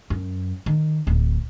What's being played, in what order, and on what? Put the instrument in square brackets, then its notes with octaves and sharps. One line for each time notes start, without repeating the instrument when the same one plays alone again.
[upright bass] F#2
D#3
D1